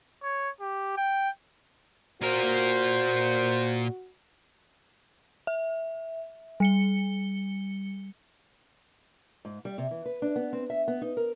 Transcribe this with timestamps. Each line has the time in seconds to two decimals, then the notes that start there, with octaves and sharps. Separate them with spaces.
0.23 C#5
0.61 G4
0.97 G5
2.22 A#2 F#4 A#4 C5
5.47 E5
6.60 G3 C#7 G7
9.45 G#2
9.65 G3
9.78 C3
9.91 E3
10.05 B4
10.22 D4
10.36 B3
10.53 C4
10.70 E5
10.88 B3
11.02 D#4
11.17 A#4